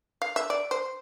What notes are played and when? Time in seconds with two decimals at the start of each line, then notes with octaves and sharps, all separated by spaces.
0.22 F5
0.36 E5
0.50 D5
0.71 C5